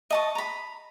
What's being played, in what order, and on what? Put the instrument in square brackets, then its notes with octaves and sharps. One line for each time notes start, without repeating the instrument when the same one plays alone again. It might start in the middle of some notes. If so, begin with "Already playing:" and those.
[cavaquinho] D#5 A5 C#6
A#5 B5